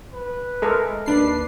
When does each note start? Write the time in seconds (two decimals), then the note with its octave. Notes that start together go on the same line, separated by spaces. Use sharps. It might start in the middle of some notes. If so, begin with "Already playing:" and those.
0.13 B4
0.62 G#3 A4 A#4
1.06 D#2 D4 B4 C7